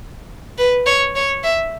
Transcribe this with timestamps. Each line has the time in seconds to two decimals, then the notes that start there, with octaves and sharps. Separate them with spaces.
0.58 B4
0.86 C#5
1.16 C#5
1.44 E5